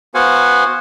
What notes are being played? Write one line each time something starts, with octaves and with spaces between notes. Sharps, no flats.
B3 F#4 C5 F5 F#5 G#5